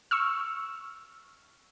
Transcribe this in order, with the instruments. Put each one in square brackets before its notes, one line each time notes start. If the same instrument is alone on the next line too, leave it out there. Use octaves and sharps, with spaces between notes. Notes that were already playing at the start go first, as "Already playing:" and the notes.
[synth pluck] C#6 E6 F6